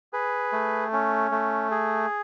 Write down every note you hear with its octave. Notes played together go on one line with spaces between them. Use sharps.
G#4 B4
A3
C#4
A3
G#4